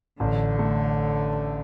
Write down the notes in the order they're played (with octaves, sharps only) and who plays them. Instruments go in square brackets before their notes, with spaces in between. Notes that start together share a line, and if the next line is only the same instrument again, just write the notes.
[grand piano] A1 [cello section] D3
[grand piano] A3